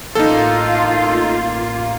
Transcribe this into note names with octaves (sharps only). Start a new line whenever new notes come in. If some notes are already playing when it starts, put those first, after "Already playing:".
A1 A#3 D#4 F4 A4